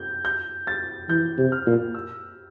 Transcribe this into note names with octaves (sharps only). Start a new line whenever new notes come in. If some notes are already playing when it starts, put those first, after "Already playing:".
Already playing: G6
G6
A6
E3 G6
C3
F6
A#2
E6